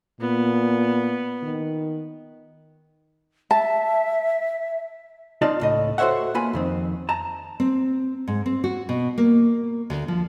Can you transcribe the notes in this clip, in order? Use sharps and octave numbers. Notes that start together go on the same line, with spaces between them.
A#2 B3
D#3
E5 A5
D#4 F4 D5 D#5 A5
C#2 A2 D#5
F#4 A4 C5 C#5 E5 F#5
A#3 F4 B4 G#5 B5
F2 D#3 C4
A5 A#5
C4
G#2
C4
F#4
B2
A#3
D2
F3